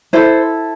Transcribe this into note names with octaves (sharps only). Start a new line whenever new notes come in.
E4 A4 C5